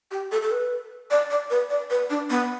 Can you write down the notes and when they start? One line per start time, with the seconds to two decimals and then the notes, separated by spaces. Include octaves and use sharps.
0.11 G4
0.32 A4
0.42 A4
0.51 B4
1.11 D5
1.30 D5
1.50 B4
1.70 D5
1.90 B4
2.10 D4
2.30 B3